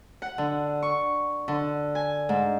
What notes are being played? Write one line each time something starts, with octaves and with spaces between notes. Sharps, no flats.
F#5
D3
C#6
D3
G#5
G#2